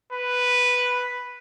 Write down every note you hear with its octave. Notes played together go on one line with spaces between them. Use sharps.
B4